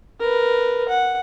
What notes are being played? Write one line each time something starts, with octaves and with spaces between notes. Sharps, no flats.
A#4 B4
F#5